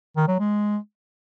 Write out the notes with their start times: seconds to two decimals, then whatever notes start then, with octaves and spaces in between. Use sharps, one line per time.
0.17 D#3
0.28 F#3
0.39 G#3